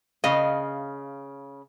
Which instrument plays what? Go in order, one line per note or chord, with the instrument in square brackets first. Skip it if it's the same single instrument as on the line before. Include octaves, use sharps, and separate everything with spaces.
[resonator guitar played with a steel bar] C#3 F5 [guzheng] D#5